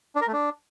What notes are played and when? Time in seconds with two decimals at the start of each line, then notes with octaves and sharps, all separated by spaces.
0.16 D4
0.21 A#4
0.27 A3
0.33 D4